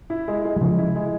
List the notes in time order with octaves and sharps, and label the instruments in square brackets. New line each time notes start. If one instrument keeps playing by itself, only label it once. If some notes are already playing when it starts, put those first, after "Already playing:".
[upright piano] E4
G#3
G#3
[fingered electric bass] G3
[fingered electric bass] C#3 F3 [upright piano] G#3
[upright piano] E4
G#3